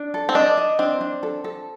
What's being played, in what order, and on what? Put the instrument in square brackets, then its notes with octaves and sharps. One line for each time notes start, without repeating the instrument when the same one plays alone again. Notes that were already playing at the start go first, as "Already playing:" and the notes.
Already playing: [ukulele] D4
A4
[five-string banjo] C4
[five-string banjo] D4 [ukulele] D#5
[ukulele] D#5
[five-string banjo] C4 [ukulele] D4
[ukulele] D4
A4
A4